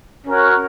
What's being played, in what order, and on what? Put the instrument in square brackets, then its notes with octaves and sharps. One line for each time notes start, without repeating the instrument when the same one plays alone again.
[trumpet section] C#4 F#4 A#4 C#5